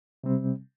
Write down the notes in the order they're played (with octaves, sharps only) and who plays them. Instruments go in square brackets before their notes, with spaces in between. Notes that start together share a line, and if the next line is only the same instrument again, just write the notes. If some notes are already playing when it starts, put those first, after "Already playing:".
[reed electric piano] C3 G3 C4